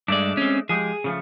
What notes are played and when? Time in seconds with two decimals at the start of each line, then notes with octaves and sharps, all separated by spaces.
0.08 G2 G#3 A3 D4 D5
0.37 C4 C#4
0.69 F3 G#3 G4 G#4
1.04 C#3 F3 A3